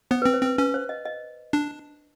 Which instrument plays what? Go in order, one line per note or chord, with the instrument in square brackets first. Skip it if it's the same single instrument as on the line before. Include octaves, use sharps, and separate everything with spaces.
[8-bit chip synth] B3 [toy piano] C5
[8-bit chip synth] C4 [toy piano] B4
[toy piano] C5
[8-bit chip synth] C4 [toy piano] B4
[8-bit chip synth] C#4 [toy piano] B4
[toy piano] C5
D#5
D#5
[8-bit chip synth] D4